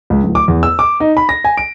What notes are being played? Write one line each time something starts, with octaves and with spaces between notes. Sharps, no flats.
C#2
D1
D6
E2
E6
D6
D#4
B5
A#6
G#5
D7